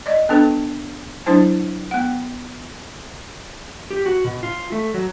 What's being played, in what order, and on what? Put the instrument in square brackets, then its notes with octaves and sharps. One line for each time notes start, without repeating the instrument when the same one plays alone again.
[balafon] D5 D#5
B3 D4 A4 B4
F#3 D4 E4 C5 A5
B3 F#5
[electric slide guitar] G4
F#4
B2
F4
A3
F#3